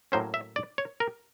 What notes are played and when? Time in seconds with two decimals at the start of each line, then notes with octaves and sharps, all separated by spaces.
0.12 A2 F#3 A#3 C#4 C5
0.34 E5
0.56 D5
0.78 C#5
1.00 A#4